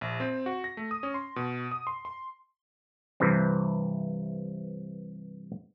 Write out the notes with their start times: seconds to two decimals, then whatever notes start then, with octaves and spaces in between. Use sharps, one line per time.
0.01 A#1
0.20 C4
0.46 F#4
0.64 A#6
0.77 A3
0.91 D#6
1.03 C#4
1.14 C6
1.36 B2
1.71 D#6
1.87 C6
2.05 C6
3.20 G2 C3 E3 C4